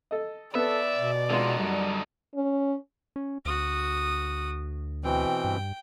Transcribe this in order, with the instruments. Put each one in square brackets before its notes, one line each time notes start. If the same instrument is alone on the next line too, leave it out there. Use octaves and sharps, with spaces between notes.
[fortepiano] A4 D#5
[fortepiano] B3 [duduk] A4 [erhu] D5 [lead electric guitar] E5
[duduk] B2
[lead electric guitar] D3 D#4 [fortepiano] G#3 B3 F4
[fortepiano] F#2 [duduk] G3
[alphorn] C#4
[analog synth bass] C#4
[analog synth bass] D2 [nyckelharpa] F#4 D#6
[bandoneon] B2 E3 C4 [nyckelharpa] G5
[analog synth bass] G2